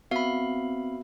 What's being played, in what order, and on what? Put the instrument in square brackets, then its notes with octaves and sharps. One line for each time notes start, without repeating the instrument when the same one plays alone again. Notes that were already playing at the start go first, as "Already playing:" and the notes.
[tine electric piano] B3 F#4 E5 [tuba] C4 [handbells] F5 B5